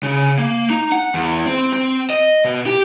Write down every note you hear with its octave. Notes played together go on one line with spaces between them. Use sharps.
C#3
A#3
D#4
F#5
E2
C4
C4
D#5
B2
G4